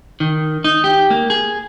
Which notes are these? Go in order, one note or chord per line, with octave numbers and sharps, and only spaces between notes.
D#3
D#4
G4
A#3
G#4